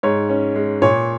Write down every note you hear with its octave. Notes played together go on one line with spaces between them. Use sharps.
G#2 C#5
C#4
G#3
A#2 C#5